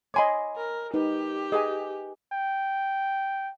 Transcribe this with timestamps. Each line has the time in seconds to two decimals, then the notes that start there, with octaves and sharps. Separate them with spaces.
0.14 C#5 D#5 G#5 B5 C6 D6
0.57 A#4
0.94 D#4 G4 B4
1.52 G#4 B4 D#5 G#5
2.32 G5